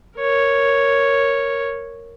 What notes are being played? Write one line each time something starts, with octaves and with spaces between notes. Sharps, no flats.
A#4 C#5